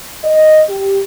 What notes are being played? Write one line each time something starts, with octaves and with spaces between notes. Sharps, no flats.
D#5
G4